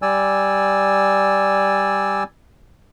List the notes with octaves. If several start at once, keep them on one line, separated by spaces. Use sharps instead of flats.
G3 D5 G#5 E6